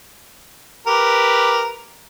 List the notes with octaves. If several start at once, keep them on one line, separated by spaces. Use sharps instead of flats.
G4 A#4 B4